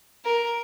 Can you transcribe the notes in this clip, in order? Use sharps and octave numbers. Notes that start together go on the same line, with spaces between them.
A#4